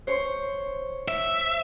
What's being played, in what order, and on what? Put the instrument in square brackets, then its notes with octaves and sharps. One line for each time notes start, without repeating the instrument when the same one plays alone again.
[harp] C5 C#5 C6
[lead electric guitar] E5